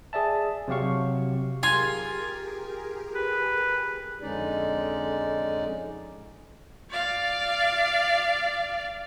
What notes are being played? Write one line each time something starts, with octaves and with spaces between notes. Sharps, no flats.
G#4 D5 E5 A5
C3 F#3 G4 F5 C#6
F4 G4 G#4 A#4 G#5
B4
F2 D3 G#3 C#4 D#4 D5
D5 F5